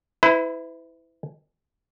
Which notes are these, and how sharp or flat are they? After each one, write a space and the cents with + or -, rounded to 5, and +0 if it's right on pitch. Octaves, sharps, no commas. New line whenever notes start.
E4 -10 B4 +40